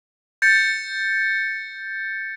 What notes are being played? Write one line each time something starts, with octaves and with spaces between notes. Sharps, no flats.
G6 A6 C#7